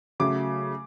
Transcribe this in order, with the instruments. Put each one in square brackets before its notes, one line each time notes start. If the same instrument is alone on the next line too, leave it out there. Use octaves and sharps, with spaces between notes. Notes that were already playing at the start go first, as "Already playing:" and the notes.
[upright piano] C#3 F#3 A3 [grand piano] D6